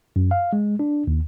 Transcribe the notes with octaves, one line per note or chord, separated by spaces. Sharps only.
F#2
F5
G#3
D4
D#2